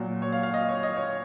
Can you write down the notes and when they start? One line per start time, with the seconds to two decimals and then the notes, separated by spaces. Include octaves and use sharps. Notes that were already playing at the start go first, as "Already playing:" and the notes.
Already playing: A#2 F#3
0.22 C#5
0.32 F5
0.43 F5
0.54 D#5
0.69 C#5
0.83 D#5
0.97 C#5